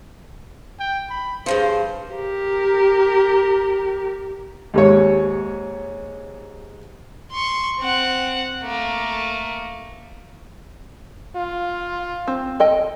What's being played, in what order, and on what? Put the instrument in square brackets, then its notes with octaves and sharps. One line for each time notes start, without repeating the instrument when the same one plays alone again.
[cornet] G5
B5
[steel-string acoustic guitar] G2 C#3 F3 [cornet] C5
[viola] G4 A#4
[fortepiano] D#2 G#2 C#5
[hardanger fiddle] C6 C#6
C4 F#5
A3 A#3
[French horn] F4
[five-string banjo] C4
A4 D#5 G5